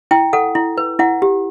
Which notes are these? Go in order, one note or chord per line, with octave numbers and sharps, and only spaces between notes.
E4 G5
A4 F#5
E4
B4
E4 F#5
G4